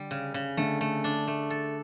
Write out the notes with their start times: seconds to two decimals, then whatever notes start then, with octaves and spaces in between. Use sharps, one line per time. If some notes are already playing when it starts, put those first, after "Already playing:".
Already playing: D3 G3
0.11 C#3
0.34 C#3
0.57 D3 A3
0.81 A3
1.04 D4
1.27 A3
1.50 A4